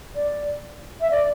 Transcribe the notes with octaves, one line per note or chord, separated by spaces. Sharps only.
D5
E5
D5